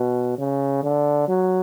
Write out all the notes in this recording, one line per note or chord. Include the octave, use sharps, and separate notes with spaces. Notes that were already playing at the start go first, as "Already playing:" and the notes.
Already playing: B2
C#3
D3
F#3